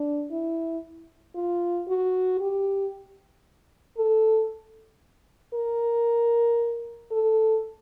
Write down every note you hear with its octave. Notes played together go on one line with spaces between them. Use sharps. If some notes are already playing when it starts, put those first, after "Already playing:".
Already playing: D4
E4
F4
F#4
G4
A4
A#4
A4